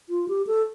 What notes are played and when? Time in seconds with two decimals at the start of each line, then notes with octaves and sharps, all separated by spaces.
0.10 F4
0.28 G4
0.47 A4